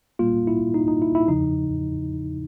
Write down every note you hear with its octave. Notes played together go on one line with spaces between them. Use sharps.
A#2 G3 A#3 F4
E4
D#4
D#4
E4
E4
E2 C#3 F3 D#4